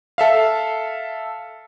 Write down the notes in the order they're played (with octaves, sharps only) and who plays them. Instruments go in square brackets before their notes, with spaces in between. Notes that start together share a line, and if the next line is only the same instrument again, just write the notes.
[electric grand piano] A4 E5 F5